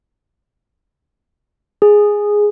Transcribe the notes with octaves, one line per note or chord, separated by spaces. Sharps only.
G#4